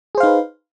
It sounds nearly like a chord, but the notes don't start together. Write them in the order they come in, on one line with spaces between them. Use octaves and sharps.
G#4 C5 F5 D#4 B4